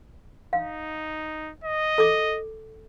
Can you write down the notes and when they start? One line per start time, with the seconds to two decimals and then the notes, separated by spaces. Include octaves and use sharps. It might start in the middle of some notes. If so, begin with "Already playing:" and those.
0.53 D#4 F5
1.64 D#5
1.98 A4 D6